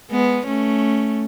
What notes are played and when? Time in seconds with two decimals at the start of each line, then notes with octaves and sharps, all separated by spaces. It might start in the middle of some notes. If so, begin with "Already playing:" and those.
0.11 G#3 B3
0.47 A3 C#4